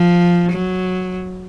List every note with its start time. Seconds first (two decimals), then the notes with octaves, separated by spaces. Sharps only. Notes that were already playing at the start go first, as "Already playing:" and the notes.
Already playing: F3
0.53 F#3